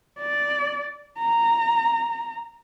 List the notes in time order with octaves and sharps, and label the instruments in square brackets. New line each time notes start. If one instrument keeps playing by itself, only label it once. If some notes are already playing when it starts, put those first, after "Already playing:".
[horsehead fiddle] D5
A#5